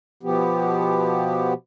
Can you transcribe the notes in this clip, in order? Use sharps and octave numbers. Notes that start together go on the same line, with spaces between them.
B2 F3 B3 G4